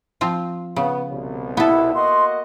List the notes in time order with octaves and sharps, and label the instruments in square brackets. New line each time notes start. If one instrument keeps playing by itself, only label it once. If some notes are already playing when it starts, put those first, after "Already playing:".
[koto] F3 C4 F4
[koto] C#3 [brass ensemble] B3
[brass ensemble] C2 B2
[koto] B3 A4 [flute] E4
[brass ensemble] A#3 F#4 D#5 [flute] C6